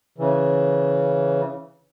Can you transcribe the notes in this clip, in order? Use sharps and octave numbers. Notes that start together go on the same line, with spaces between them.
C#3 E3